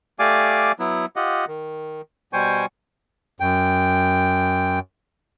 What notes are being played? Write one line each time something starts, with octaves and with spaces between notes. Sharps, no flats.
A3 G4 D5 F5 G#5 D6
F#3 B3 E4
F4 G4 D#5 F#5
D#3
B2 G3 C5 G5 G#5 C#6
F#2 G5